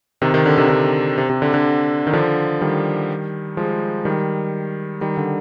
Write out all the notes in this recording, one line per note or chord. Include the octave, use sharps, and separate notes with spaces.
C3 D#3
C3 D#3
D3
C3 D#3
D3
C3
C3
D3
D3
D#3
D3 F3
D#3 G3
F3 G#3
D#3 G3
D#3 G3
D3